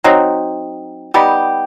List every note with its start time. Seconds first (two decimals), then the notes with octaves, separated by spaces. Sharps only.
0.04 F#3 C4 D#4
1.14 G3 B3 D#4 G4